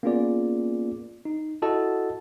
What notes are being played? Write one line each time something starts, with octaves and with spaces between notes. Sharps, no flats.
A#3 B3 C#4 F4 G#4 D5
D#4
E4 F#4 A4 D#5 F#5 A5